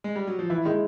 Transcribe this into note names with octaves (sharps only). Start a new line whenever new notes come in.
G#3
G3
F#3
F3
E3 E4
D#3 G#3